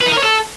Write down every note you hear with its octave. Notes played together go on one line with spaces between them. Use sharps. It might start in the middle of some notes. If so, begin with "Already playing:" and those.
B4
D#4
A#4
C#5
A4